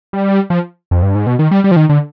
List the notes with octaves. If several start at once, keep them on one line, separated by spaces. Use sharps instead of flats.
G3
F3
F2
G2
G#2
B2
D#3
G3
G3
F3
D#3
D3